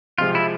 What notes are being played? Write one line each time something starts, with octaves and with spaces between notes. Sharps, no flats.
C3 F3 G#3 C4 F4
E4